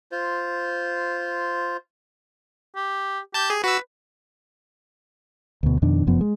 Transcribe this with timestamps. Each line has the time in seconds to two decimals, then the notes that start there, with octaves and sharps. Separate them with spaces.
0.12 F4 C5
2.76 G4
3.34 G4 A5 G6
3.50 G#4
3.64 F#4 B4 E6
5.63 D2 B2
5.82 F2 B2 D#3 D4
6.07 F1 F#2 F3 B3
6.21 G#3